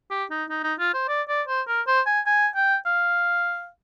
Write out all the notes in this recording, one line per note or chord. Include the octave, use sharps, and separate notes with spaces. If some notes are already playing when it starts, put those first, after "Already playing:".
G4
D#4
D#4
D#4
F4
C5
D5
D5
C5
A#4
C5
G#5
G#5
G5
F5